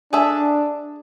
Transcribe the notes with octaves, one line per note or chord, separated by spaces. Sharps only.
D4 G#4 A4 E5